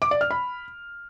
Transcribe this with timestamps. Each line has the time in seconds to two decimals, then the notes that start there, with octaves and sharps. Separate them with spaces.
0.02 D6
0.11 D5
0.21 F6
0.31 B5